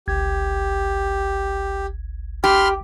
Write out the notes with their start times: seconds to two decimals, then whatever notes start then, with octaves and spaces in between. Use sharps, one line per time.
0.08 G1 C#2 G4 G#6
2.44 G4 B5 C6 F6